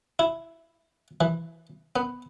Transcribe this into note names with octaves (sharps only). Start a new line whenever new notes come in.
E4
E3
B3